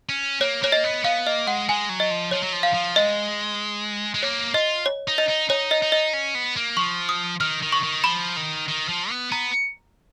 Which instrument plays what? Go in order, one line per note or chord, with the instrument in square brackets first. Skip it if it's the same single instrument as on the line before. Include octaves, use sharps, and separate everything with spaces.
[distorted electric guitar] C#4
[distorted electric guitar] A#3 [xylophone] C#5
[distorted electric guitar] A#3 [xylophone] C#5
[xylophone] D#5
[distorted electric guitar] B3
[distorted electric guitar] B3 [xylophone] F5
[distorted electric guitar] A#3 [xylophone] D#5
[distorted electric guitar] G#3 [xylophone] F#5
[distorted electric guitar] G#3 [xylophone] G#5
[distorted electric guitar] F#3
[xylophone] D#5
[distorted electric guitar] F3
[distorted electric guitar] F3 [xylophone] C#5
[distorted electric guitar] F#3
F3
[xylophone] F5
[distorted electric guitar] F3
[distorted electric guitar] G#3 [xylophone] D#5
[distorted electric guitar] G#3
[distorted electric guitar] A#3 [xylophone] C#5
[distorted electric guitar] F4 [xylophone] D#5
[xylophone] C#5
[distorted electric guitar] D#4
[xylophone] D#5
[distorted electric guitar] D#4
[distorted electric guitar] D#4 [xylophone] C#5
[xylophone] D#5
[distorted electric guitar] D#4
[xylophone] D#5
[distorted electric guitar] C#4
B3
A#3
[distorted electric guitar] F3 [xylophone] C#6
[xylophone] D#6
[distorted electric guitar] D#3 [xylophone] F6
[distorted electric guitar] D#3
[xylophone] C#6
[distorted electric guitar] D#3
[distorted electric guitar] F3 [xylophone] B5
[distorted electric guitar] D#3
D#3
F3
B3
[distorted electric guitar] B3 [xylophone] A#5